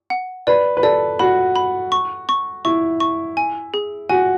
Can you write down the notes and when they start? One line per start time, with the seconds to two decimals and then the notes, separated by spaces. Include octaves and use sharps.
0.10 F#5
0.47 B4 D5
0.77 B4
0.83 A4 D5
1.19 F#4 B5
1.56 B5
1.92 C#6
2.29 C#6
2.65 E4 C#6
3.00 C#6
3.37 G#5
3.74 G#4
4.09 F#4 G#5